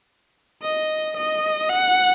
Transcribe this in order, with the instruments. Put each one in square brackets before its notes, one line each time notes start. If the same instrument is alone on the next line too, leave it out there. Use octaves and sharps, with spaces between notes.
[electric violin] D#5
D#5
F#5